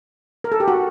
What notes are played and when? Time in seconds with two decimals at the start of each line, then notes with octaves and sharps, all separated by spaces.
0.44 A#4
0.52 A4
0.60 G4
0.68 F#4